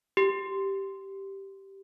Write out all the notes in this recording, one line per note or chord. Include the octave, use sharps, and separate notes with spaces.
G4